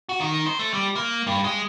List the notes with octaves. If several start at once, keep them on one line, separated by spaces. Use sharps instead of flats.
F#4
D#3
C5
A3
G3
A#3
G2
G#3